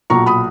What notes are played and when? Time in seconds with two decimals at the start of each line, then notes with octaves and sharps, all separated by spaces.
0.10 B1 A#2 A#5 C#6
0.26 B5 D#6